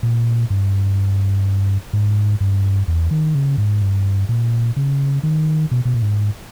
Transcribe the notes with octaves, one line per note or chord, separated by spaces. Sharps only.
A#2
G2
G#2
G2
E2
D#3
C#3
G#2
G2
A#2
C#3
D#3
B2
B2
A#2
G#2